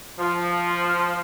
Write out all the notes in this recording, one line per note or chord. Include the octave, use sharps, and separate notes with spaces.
F3